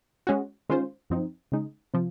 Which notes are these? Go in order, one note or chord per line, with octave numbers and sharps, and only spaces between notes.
G#3 C#4 F#4
D#3 G#3 C#4 F4 C5
F#2 F3 C4 D#4
C#3 G#3 D#4
C3 F3